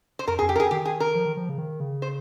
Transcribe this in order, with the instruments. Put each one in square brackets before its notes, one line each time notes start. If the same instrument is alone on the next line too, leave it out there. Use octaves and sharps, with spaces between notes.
[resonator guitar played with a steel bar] C5
[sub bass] F2 [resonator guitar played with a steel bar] A#4
[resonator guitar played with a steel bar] G#4
[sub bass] F2
[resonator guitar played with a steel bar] G4
A#4
G#4
[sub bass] D#3 [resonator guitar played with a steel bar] G4
[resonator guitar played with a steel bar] G#4
A#4
[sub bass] F3
D#3
F3
C#3
D#3
C#3
[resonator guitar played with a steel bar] C5